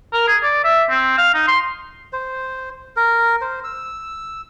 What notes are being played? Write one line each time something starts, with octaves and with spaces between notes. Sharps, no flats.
A#4
G#4
D5
E5
C4
F5
D#4
C6
C5
A#4
C5
E6